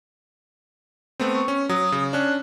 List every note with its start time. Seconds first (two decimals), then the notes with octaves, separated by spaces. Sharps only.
1.20 A3 B3 C4
1.35 C#6
1.48 C#4
1.69 F#3 D#6
1.92 C#3
2.13 C#4 D4 F#6